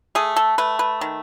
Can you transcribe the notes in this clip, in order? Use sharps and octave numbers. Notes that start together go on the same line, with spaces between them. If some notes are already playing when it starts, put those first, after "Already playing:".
A3 G#4
A4
A3 B4
B4
D#3